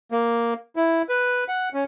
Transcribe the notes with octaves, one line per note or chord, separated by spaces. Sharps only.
A#3
E4
B4
F#5
C#4